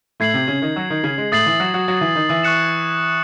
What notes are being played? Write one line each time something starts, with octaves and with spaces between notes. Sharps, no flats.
A2 A3 G#6 C7 F#7
C3 C4
C#3 C#4
D#3 D#4
F#3 F#4
D#3 D#4
C#3 C#4
G#3
A2 A3 D#6 A6 C7 F#7
E3 E4
F#3 F#4
F#3 F#4
F#3 F#4
E3 E4
D#3 D#4
E3 E4
C#6 F#6 C#7 E7